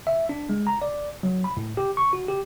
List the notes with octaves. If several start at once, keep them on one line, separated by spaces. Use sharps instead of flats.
E5
D4
G#3
A#5
D5
F#3
B5
A2
G4
C#6
F#4
G4